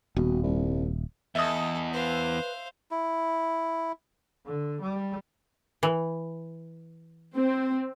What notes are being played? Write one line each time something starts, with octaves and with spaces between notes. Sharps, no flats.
D#1 B2
C2
E2 A4 D#5 E5 D#6
B4 C5 F5
E4
D3
G3
E3
C4